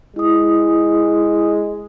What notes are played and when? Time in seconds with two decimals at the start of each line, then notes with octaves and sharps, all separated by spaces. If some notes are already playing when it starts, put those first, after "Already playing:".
0.16 G#3 E4 D#6